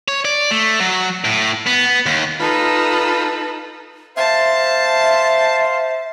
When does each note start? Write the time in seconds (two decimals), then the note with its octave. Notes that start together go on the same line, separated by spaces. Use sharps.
0.08 C#5
0.25 D5
0.51 A3
0.80 F#3
1.25 A2
1.67 B3
2.06 D#2
2.40 D#4 F4 A4 B4 B5
4.16 C5 E5 F5 A5